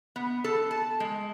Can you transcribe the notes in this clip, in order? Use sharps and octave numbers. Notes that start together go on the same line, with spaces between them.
B3
A4
A5
G#3